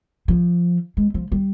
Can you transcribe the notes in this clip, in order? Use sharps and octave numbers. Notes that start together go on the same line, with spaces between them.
F3
G#3
F3
G3